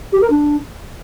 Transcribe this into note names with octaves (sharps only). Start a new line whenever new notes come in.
G4
A#4
D4